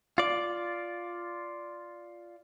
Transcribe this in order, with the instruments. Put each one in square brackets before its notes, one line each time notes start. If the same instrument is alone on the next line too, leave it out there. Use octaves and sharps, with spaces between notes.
[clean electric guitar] F4 D5